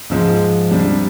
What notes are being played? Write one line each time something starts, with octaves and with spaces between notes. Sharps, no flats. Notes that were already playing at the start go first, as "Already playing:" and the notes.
G#2 F3 G#3
C3 G3 D4